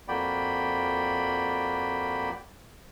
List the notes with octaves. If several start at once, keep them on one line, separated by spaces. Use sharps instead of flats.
F2 A#3 F#4 D5 G5 B5